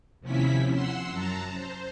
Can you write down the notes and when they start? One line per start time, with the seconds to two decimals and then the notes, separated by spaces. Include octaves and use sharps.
0.21 D#2 C3 F3 C#4 E4 B6
0.72 F#5 C6 E6
1.10 F#2 A5 A#5
1.53 C5